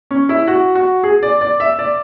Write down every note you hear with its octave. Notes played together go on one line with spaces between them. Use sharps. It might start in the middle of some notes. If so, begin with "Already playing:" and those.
C#4
E4
F#4
F#4
G#4
D5
D5
E5
D5